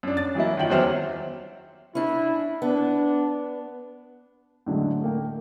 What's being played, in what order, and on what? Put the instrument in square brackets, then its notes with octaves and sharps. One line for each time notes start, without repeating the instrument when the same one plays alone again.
[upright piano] F#2 D4
A6
E3 F#3 A#3 E4
D#3 F4 G5 F#7
E2 F#3 C5 E5 F6
[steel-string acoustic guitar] C#4 D4 [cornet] E4
[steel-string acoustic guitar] B3 [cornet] D4
[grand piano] A2 D3 F#3 G#3
A3 A#3 G5